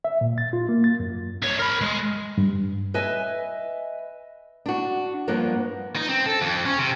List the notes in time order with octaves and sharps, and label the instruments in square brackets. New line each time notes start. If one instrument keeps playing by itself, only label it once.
[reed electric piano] E5
A#2
A6
F4
A#3
A6
F#2
[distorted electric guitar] C2 C#5
A#4 B5
G#3
[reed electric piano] G2
[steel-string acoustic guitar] B4 D#5 E5 G#5
D4 F#4
G2 F3 A#3 B3 D4
[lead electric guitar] D#4
C4
A4
F2
C#4
C3